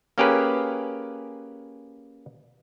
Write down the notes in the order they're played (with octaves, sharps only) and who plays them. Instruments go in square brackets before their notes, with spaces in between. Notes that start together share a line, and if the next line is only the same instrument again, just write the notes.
[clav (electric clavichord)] A#3 C#4 G4 G#4 A#4 B4